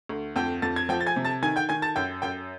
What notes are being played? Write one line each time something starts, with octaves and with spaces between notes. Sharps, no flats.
D2
F2 G5 G6
F2 A6
G#6
F3 G5 G6
A6
G#5 G#6
C3
A5 A6
D#3 G#5 G#6
G5 G6
D#3 G#5 G#6
A5 A6
F#2 G5 G6
F#2 G5 G6